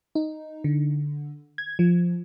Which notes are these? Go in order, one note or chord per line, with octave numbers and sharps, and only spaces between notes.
D#4
D3
G#6
F3